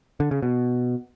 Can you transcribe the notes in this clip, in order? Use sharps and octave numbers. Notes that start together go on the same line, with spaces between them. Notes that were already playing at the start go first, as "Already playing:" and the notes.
D3
C#3
B2